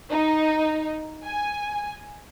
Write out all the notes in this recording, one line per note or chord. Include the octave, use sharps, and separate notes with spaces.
D#4
G#5